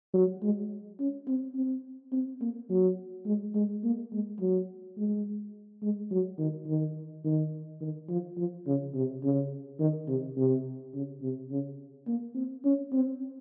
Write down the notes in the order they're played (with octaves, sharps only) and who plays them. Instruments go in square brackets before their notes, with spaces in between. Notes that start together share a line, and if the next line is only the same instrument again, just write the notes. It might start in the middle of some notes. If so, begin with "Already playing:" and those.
[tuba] F#3
G#3
C#4
C4
C4
C4
A#3
F#3
G#3
G#3
A#3
G#3
F#3
G#3
G#3
F#3
D#3
D#3
D#3
D#3
F3
F3
C#3
C3
C#3
D#3
C3
C3
C#3
C3
C#3
A#3
C4
C#4
C4